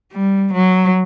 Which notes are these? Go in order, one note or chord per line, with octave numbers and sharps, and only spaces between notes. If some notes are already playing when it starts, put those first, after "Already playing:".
G3
F#3